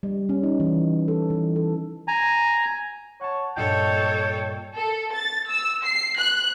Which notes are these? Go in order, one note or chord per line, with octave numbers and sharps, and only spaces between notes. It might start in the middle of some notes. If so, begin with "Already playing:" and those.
G3
C#4
D#4
E3
A4
E3
A4
G#5 A#5
C#5 F#5 A5
G2 A#2 A4 C#5 D#5 G5
A4
A6
E6
C7
F#6